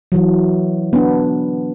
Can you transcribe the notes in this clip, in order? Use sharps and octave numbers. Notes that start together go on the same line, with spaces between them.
E3 F#3
B3 D4